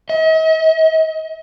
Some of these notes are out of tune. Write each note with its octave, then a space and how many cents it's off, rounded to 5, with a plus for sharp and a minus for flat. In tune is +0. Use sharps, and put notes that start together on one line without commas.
D#5 +45